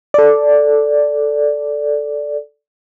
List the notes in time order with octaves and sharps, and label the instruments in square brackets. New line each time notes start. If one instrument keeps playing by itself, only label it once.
[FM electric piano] A4 D5